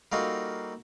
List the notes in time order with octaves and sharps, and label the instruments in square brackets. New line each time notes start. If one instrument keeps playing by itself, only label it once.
[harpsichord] G3 A#3 D#4 F4 F#4 A4